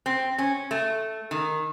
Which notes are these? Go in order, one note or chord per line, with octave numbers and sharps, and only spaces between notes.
C4
C#4
A3
D#3